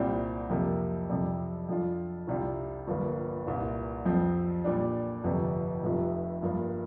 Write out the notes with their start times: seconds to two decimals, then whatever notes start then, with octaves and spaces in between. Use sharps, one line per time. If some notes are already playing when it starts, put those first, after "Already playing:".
Already playing: C2 A#2 G3 C4
0.50 F2 C3 A#3
1.09 F2 C3 G3
1.69 F2 F3 D4 F4
2.27 C2 C3 G3 D4 F4
2.87 G1 G2 F3 A#3 F4
3.46 C2 A#2 A#3 F4
4.05 F2 F3 C4
4.64 A#2 G3 D4
5.24 G1 F2 C3
5.83 F1 F2 C3 F3
6.42 G2 F3 A#3 F4